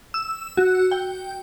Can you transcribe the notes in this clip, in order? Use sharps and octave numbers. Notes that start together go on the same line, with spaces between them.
E6
F#4
G5